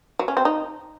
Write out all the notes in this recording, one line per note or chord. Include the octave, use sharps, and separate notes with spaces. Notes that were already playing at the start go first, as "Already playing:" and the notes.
F#3
C#4
C4
D#4